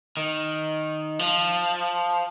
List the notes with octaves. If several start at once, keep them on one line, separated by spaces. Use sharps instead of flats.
D#3
F3